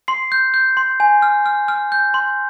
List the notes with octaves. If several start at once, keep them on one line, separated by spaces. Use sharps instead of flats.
C6 C7
G6
G6
C6
G#5
F6
F6
F6
G6
C6